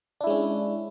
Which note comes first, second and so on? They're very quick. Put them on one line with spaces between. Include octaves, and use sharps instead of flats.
D4 E4 G#3 C#4